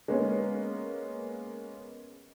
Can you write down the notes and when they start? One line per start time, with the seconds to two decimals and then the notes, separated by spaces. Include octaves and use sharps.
0.08 G#3 A#3 B3 C#4